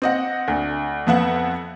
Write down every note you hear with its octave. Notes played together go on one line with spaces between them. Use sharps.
C4 D#5 F#5
D2
F2 B3 E5 F#5